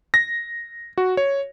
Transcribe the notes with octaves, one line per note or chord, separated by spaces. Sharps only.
A#6
F#4
C#5